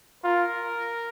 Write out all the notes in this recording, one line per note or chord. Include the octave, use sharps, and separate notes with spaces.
F4 A#4